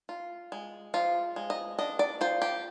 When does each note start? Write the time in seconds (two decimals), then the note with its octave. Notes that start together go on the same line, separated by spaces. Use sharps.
0.09 F4
0.52 G#3
0.94 F3 F4
1.36 G#3
1.50 D#5
1.79 D4 D#5
1.99 D5
2.21 F4 C5
2.42 G4